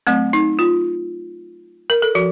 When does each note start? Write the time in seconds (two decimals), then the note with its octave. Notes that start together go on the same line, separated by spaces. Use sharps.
0.07 F#3 A3 C4
0.33 D#4
0.59 F4
1.90 A#4
2.02 A4
2.15 F3 F#4